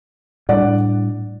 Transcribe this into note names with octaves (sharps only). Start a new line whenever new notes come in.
A2 G3 D4 D5 F#5